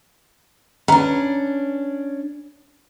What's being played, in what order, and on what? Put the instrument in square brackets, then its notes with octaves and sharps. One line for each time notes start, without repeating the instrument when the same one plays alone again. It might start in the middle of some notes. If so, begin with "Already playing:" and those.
[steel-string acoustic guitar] C#4 D4 [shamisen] B4 A#5